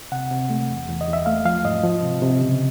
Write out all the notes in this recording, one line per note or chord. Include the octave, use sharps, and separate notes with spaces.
C3 F#5
C3
A3
E2
E2
D#5
E2
E5
A3 F5
F3 F5
G#2 D#5
F3
C3
C3
C#3